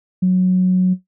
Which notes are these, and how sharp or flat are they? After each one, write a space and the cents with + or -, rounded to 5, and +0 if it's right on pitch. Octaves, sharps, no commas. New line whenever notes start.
F#3 -10